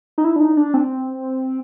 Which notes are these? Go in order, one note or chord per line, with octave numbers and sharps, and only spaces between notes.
D#4
E4
D4
D#4
D4
C4